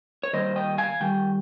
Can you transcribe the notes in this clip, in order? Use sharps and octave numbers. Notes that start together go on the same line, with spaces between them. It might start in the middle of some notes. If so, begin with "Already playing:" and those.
C#5
D#3 G3 A#3 C5 D#5
D#5 G5
F5 G#5
D#3 G3 G5